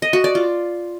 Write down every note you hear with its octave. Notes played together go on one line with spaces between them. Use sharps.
D#5
F#4
D5
F4